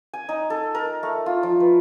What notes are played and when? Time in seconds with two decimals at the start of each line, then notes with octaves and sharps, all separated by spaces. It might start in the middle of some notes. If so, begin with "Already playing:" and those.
0.14 G#5
0.29 D#4
0.50 A4
0.75 A#4
1.03 A3
1.26 F4
1.43 F3
1.60 B4